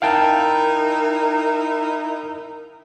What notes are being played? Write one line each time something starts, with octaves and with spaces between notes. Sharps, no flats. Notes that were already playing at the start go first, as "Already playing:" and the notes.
D#4 E4 A#4 F5 G5 A5